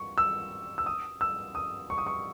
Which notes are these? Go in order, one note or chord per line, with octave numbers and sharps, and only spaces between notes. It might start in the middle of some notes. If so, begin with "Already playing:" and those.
Already playing: C#6
E6
E6
D#6
E6
D#6
C#6
D#6
C#6